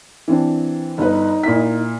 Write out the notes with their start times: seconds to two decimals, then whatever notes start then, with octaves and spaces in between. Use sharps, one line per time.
0.28 E3 C4 D4
0.98 G1 D#4 B4
1.43 A#2 E4 B6